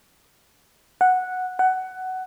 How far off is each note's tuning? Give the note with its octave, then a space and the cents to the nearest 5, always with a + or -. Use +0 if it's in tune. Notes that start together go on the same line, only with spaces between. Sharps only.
F#5 -5
F#5 +15